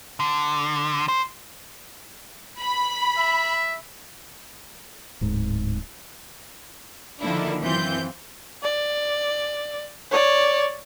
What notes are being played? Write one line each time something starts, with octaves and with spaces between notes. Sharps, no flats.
D3
C5
B5
E5
D1 G#2
D3 D#3 F3 A#3 D4 E4
F#2 E3 C4 F4 G6
D5
C#5 D5